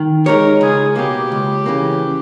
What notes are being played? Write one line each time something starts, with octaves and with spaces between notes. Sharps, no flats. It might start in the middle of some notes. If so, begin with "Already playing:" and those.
Already playing: D#3
G#3 D#4 G4 A#4 C#5
C#2 G#4
B2 A#3 G4
C#2
C#3 E3 A#3